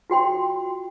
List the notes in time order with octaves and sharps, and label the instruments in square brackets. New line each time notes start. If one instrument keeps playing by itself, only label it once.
[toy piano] F4 F#4 G5 C6